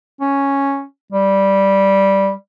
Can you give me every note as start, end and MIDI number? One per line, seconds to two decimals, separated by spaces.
0.21 0.84 61
1.12 2.31 55